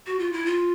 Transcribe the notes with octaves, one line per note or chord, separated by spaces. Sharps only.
F#4
F4
E4
F4